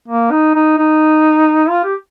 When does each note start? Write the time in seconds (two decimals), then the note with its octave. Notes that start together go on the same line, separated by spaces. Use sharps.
0.08 A#3
0.31 D#4
0.54 D#4
0.78 D#4
1.69 F4
1.84 G4